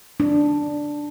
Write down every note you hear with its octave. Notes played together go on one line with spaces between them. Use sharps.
D4